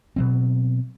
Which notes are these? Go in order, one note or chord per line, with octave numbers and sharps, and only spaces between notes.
B2 F#3 C4